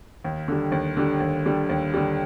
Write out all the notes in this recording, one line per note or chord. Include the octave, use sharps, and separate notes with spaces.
D#2
D3 G3
D#2
D3 G3
D#2
D3 G3
D#2
D3 G3